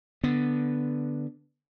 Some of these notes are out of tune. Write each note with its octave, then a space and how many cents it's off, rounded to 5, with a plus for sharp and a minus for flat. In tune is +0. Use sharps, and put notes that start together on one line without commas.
D3 +0 B3 -5